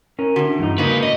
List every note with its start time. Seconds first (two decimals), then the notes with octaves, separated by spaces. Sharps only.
0.19 C#4 A#4
0.36 A2 D3 F#4
0.59 E2 G2 D#4
0.78 G#2 C#3 F3 A#3 D#4 B4
1.03 A2 D#5